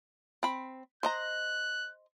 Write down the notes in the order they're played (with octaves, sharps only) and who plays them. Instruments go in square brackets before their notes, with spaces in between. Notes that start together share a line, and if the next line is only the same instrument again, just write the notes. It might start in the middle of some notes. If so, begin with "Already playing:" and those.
[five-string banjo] C4 B5
[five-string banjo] C5 D#5 A#5 [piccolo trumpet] F#6